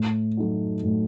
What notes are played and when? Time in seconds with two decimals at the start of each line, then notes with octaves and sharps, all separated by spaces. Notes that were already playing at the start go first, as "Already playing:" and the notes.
Already playing: A2
0.37 F#3 A3 D#4 F#4
0.84 A2